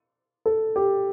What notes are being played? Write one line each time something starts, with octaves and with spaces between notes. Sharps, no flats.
A4
G4